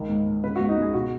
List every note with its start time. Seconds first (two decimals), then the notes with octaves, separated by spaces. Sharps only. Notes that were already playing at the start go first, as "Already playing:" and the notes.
Already playing: C#2 D#3
0.09 G#2
0.26 G#2
0.44 C#3 B4
0.56 C#2 F#4
0.69 D#4
0.77 C#2 G#4
0.94 B2 F#4